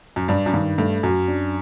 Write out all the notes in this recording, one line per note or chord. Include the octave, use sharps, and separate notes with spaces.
F#2
G2 D4
F#2
G2 D#3
G2 A3
F#2 F#3
D4